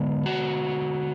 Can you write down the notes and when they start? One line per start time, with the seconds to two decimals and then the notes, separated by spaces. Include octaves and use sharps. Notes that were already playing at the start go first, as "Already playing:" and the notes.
Already playing: D3 G#3 B3
0.26 F#4